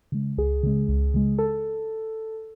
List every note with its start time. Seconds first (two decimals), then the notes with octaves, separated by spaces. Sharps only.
0.12 C#3 G#3
0.38 C#2 G#4
0.63 C#3 G#3
0.88 C#2
1.14 C#3 G#3
1.39 A4